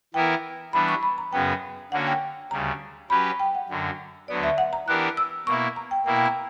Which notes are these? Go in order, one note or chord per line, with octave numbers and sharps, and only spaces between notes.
E3 B3 E4 A#4 G5
E3 G3 B3 D4 B5
C#6
B5
A#5
F#2 C#3 F#3 B3 G5
D3 A#3 C#4 F#4 F#5
G5
D2 C#3 G3 A#5
F#3 C#4 G4 B4 B5
G5
F#5
F#2 D3 F#3
D2 D3 F#3 B3 D5
E5
F#5
A#5
E3 B3 D4 G4 A#4 F#6
E6
B2 A#3 E4 C#6
A#5
G5
B2 A#3 E4 G5
G5
A#5